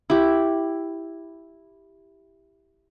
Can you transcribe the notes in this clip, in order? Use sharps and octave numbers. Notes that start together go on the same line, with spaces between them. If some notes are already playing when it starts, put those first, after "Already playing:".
E4 G4